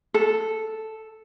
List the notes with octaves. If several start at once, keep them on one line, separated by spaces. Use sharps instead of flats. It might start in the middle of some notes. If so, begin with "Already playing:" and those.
A4